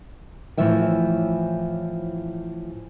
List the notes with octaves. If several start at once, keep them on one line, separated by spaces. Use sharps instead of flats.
A2 E3 F3 C#5 E5 G5